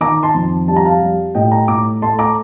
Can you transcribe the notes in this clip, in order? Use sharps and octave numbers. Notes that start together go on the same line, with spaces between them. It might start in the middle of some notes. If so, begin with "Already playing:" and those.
D#3 A#5 D6
A5 C6
F2
G3 A5
A#5
F5 A5
G3
A2 D#5 G5
G5 A#5
A2 A#5 D6
A3 A5 C6
A#5 D6